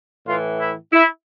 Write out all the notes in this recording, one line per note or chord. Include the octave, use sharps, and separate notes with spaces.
A2 E3 F4
E4
E4